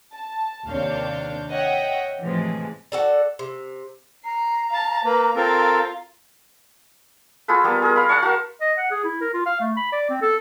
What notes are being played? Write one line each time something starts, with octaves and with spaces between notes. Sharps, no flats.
A5
D#2 C3 D4 C#5 F5 G6
C#5 D#5 E5 F#5 G5
A2 C3 E3 F3 G#3
F#4 A4 D5
C3
A#5 C7
F5 A5
A#3 B4
C4 F4 A4 A#4
F4 G#4 A4 B4
G3 A#3 B3
G#4 A#4
F5 B5
F5 A5 C#6
F#4 A#4
D#5
F#5
G#4
E4
A#4
F4
F5
A3
B5
D5
C4
A4